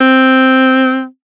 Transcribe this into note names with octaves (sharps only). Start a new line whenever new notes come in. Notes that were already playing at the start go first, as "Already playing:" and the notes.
C4